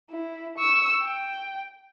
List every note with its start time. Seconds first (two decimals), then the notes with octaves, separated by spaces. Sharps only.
0.10 E4
0.58 C#6 E6
1.04 G5